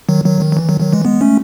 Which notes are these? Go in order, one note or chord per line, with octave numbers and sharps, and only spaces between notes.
D#3 F#3
D#3 F#3
D#3
F#3
E3
D#3 F#3
D#3 F#3
E3 G#3
G#3 B3
A3 C#4